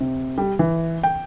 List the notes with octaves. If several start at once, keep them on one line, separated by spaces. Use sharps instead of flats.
C3
G3
E3
G5